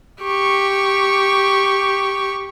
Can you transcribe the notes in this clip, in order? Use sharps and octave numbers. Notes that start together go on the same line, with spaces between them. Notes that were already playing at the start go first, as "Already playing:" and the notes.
G4 C#6